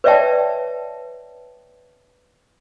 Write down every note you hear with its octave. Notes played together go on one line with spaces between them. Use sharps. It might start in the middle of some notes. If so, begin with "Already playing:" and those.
B4 C#5 D5 E5 G5 A5